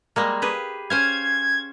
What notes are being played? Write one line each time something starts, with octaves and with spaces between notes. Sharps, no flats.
G3 G#3 A#3
G4 G#4 B4
C#4 C5 F5 G#6